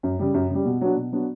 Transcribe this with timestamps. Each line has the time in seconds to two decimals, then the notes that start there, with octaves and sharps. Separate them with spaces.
0.03 F#2
0.19 C#3 G3
0.34 F#2
0.50 C#3 G3
0.65 B2
0.81 F#3 B3 D4 F#4
0.97 B2
1.12 F#3 B3 D4 F#4